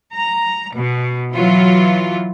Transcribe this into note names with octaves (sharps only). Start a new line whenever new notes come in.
A#5
B2
E3 F#3 F4